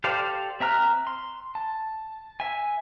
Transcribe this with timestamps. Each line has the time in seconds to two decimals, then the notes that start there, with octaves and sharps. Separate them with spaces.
0.04 G4 A4 C5 D5 F5
0.60 C4 E5 A#5 F6 F#6
1.07 C6
1.55 A5
2.40 E5 G#5